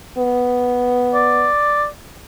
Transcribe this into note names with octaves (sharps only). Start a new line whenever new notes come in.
B3
D5